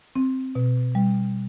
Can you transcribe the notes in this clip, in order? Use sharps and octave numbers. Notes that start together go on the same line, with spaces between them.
C4
B2
G3